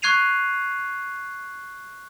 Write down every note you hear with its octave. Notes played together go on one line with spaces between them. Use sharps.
C#6 F#6 G#6 C7 D#7 F7